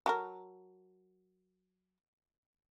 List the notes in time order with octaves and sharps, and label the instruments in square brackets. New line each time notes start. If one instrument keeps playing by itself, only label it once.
[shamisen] F#3 A4 A#4